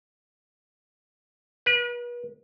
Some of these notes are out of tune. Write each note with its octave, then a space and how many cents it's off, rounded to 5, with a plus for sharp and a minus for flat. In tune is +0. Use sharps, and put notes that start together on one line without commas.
B4 -40